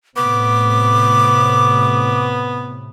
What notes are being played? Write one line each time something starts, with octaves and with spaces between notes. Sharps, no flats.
A2 C3 B3 D6